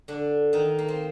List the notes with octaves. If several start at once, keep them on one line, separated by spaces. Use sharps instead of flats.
D3 D4
D#3 D#4
A#3
C4